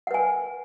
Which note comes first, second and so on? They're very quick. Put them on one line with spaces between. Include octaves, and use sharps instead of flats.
F#5 B4 G#5